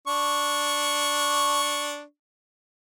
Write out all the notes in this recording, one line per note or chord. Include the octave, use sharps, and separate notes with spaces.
D4 C#6